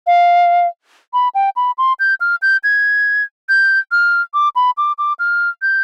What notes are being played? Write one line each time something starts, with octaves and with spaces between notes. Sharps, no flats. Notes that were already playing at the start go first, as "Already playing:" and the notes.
F5
B5
G5
B5
C6
G6
F6
G6
G#6
G6
F6
D6
B5
D6
D6
F6
G6